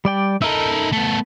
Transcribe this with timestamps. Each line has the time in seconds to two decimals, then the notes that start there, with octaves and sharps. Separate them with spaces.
0.05 G3 D5 G5
0.42 D#4 E4 A4 A#4 E5
0.92 A3 B3 A5